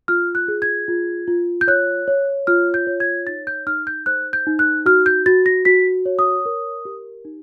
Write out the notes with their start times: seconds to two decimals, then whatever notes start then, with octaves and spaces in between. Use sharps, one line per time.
0.08 F4 F6
0.35 F#6
0.48 G#4
0.62 G#6
0.88 F4
1.28 F4
1.61 G6
1.68 C#5 F#6
2.08 C#5
2.47 F4 F6
2.74 G6
2.87 C#5
3.00 G#6
3.27 D#4 A6
3.47 G6
3.67 D#4 F6
3.87 G6
4.06 C5 F#6
4.33 G6
4.47 D#4
4.59 F#6
4.86 F#4 F6
5.06 G6
5.26 F#4 A6
5.46 A#6
5.65 F#4 B6
6.06 C#5
6.19 D#6
6.46 A#4
6.85 G4
7.25 D#4